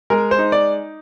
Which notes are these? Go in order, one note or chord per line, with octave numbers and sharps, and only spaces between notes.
G#3 A#4
C5
D#4
D5